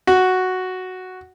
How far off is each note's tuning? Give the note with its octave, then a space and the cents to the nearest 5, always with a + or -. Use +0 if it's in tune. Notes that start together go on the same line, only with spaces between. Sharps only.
F#4 +0